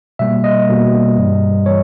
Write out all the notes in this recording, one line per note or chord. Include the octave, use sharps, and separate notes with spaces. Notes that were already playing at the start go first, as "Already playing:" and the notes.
B2 G3 A#3 E5
D#5
B2 G3 A#3
G2 E3 G3
E3 G3 C#5